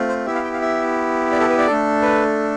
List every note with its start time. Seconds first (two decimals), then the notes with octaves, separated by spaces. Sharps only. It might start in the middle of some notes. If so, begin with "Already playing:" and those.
Already playing: A3 C4 F4
0.09 C5
0.26 B3 E4 G4 E5
0.35 F5
0.44 G5
0.53 F5
0.62 E5
1.32 D5
1.40 A4
1.50 B4
1.59 D5
1.67 A3 D4 A4
2.02 B4